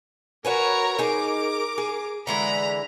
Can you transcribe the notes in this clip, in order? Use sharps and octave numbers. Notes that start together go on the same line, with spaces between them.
F#4 A#4 B4 C#5 G#5 A#5
D#4 G#4 A#4 D6
G#4
D3 E3 G#3 A#5 B5